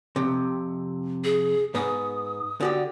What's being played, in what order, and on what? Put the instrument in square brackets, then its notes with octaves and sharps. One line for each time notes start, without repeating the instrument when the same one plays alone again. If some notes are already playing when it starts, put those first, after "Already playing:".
[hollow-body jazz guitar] F2 C3
[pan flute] G#4
[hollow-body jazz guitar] G#2 B3 [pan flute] D#6
[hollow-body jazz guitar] D3 F#4 G4